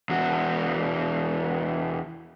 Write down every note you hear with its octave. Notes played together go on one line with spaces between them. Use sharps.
E2 F#4